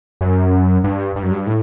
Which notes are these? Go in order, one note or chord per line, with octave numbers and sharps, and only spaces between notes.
F#2
G2
G2
F#2
G2
A2